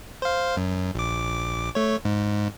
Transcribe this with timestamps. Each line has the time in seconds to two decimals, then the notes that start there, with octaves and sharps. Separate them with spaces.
0.22 C5 F5
0.57 F#2
0.95 A#1 D6
1.75 A3 C#5
2.05 G#2